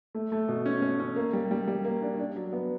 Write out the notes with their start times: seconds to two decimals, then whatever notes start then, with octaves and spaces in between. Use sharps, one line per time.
0.15 A3
0.32 A3
0.49 B2
0.66 C#4
0.82 C#4
1.00 C#4
1.16 A#3
1.33 G3
1.51 G3
1.68 G3
1.84 A#3
2.02 D4
2.19 D4
2.36 F#3
2.53 B3